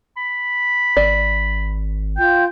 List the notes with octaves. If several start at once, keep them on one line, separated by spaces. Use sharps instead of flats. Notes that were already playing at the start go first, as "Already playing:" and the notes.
B5
G#1 D5
F4 G5 G6